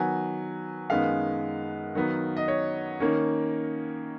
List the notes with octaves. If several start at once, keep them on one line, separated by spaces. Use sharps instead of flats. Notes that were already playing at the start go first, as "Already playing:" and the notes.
Already playing: D#3 F#3 B3 G#5
F#2 D#3 G#3 B3 F5
D#3 F#3 B3
D#5
C#5
D#3 A#3 C#4